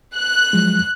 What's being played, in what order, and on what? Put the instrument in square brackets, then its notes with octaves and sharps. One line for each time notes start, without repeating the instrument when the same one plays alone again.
[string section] F#6
[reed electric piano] F3 F#3 G#3